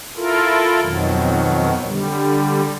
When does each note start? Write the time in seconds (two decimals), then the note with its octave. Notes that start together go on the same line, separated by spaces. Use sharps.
0.16 E4 F4 A4 A#4
0.80 F2 B2 D#3 F#3
1.85 D3 G3